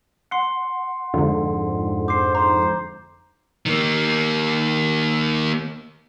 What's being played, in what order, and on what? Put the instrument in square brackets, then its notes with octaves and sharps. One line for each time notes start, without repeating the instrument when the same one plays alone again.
[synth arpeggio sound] F#5 [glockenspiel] C6 C7 C#7
[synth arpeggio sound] F2 G#2 [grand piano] D3
[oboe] C5 [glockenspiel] D6 C7
[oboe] C5 [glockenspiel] A#5
[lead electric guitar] D#3 A#3